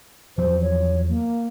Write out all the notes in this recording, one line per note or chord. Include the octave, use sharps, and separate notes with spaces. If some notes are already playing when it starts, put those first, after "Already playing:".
E2 F3 F#3 C5
C#5
A#3